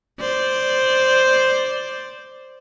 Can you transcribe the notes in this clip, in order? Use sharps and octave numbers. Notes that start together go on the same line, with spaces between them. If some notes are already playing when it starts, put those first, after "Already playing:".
C5 D5